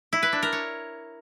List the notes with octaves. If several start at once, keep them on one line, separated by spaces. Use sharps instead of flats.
E4
B4
D4
A#4
C#5